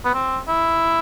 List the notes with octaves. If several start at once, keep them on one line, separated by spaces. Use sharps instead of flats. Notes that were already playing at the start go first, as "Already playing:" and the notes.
B3
C4
E4